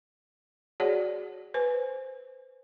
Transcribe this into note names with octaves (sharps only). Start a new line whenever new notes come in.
F#4 G#4 C#5 D5 F#5
B4 C5 G#5